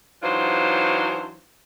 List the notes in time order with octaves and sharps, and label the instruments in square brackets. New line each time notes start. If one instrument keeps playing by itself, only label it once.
[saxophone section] E3 F#3 D4 D#4 F4 C5